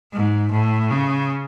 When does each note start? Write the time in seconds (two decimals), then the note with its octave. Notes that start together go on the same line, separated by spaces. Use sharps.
0.13 G#2
0.52 A2
0.90 C#3